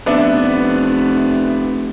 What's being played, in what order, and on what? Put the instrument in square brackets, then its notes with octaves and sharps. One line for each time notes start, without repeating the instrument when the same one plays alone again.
[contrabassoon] F1 [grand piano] B3 D4 E5